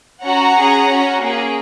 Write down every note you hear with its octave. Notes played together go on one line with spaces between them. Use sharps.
C#4 F#4 F#5 A#5
C#4 G#4
C#4 F#4
A#3 C#4 G#4